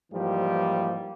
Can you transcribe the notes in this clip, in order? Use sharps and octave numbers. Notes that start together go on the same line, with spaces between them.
G#2 E3 F3 G3 A#3 G4